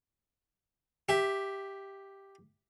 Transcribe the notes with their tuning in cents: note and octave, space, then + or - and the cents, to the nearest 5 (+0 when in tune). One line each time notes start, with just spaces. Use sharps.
G4 +0 E5 +0